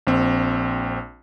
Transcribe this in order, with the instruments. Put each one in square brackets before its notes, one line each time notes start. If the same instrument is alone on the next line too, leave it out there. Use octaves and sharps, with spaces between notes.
[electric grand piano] A#1 C4